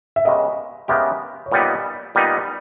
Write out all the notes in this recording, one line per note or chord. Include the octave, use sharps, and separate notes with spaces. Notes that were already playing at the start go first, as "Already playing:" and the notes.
E5
C#3 G#3 B3 G4 A#4 D#5
C#3 G#3 B3 G4 A#4 E5
C#5
A#2 G3 B3 D#4 D#5
A#2 G3 B3 D#4